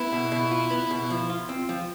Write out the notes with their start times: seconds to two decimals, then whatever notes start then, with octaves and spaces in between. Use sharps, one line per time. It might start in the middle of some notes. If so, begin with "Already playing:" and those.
Already playing: B3 E4
0.12 B2
0.32 B2
0.51 F4
0.71 B3
0.91 B2
1.10 F3
1.30 F4
1.49 C4
1.69 F3